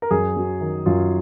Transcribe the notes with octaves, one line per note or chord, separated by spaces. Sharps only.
A#4
F#2 G#4
F#3
D#3
F#2 F4